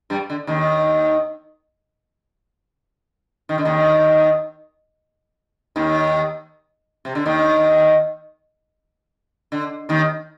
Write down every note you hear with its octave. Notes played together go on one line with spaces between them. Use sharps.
G2 G3
D3
D#2 D#3
D#3
D3
D#2 D#3
D#2 D#3
C3
D3
D#2 D#3
D3
D#2 D#3